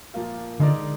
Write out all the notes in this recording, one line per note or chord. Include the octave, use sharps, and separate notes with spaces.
A#2 F3 A#3 F4
D3 G#3 D#4 A#4 D5